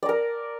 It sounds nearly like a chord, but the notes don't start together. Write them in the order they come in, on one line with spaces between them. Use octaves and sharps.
D5 A#5 A#4